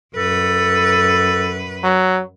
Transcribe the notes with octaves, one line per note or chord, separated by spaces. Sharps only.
F#2 A4 B4
F#3